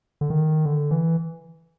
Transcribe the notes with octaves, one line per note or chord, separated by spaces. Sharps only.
D3
D#3
D3
E3